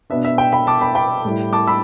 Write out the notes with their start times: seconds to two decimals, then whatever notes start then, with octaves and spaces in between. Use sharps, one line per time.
0.10 B2 B3 D4 E5
0.25 E5
0.38 G5
0.52 G5 B5
0.67 A5 D6
0.81 G5 B5
0.95 G5 B5
1.25 A2 G3 E4
1.53 A5 D6
1.67 B5 E6